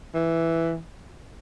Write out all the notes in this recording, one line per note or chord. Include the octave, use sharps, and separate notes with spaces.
E3